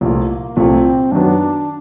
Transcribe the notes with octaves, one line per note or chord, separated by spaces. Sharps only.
C2 A#2 F3 A3 A#3
C2 A#2 F3 A3 C4
F#2 D#3 F#3 B3 D4